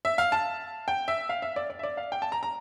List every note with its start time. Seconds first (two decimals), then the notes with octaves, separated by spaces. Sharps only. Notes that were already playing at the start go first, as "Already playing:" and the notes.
0.05 E5
0.18 F5
0.32 A5
0.88 G5
1.08 E5
1.29 F5
1.42 E5
1.56 D5
1.70 D5
1.79 E5
1.83 D5
1.97 F5
2.12 G5
2.22 A5
2.32 A#5
2.43 A#5